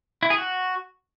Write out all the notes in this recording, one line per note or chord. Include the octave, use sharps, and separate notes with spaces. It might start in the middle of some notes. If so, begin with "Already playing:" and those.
E4
G#4
F#4